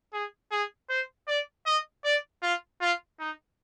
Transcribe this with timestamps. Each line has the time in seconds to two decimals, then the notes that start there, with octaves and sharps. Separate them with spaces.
0.13 G#4
0.52 G#4
0.89 C5
1.28 D5
1.66 D#5
2.04 D5
2.42 F4
2.81 F4
3.19 D#4